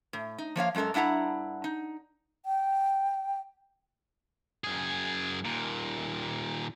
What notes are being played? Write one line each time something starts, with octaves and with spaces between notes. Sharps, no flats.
A2
D#4
F3 A#3 C#5 F5
F#2 G#3 A3 A4 A#4
G2 D4 E4 F#5 A#5
D#4
G5
F#2 G#4
D#2 A#2